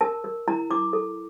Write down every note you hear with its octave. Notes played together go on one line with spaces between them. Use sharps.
A#4 A5
A#4
E4 A#5
E4 D6
A4